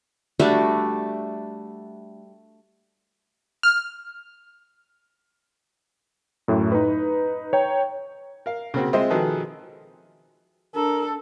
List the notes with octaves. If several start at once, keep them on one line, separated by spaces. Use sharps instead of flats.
G3 A3 D4 F#4
F6
F#2 A2 A3
D#4 B4
C#5 G5 A#5
A#4 F5
C#3 A#3 C4 F#4
G#3 C4 F4 C5 D#5 E5
B2 D#3 F3 G#4 A4 B4
D4 A4 A#4